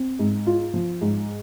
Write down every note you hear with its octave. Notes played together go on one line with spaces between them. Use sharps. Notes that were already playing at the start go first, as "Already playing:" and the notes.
Already playing: C4
G#2
F4
F3
G#2